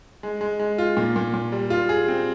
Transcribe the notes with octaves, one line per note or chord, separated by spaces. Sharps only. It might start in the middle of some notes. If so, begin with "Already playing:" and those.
G#3
G#3
G#3
F4
A#2
A#2
A#2
G3
F4
G#4
C4